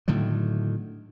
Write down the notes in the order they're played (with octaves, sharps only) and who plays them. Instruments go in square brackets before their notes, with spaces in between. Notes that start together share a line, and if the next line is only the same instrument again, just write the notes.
[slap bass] A2 D3 D#3 F#3